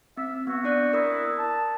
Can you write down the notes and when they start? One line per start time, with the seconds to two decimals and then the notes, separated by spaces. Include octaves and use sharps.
0.17 C4 E5
0.47 B3 F#4
0.64 D4 D5 F#6
0.93 E4 A#4 D#6
1.39 A5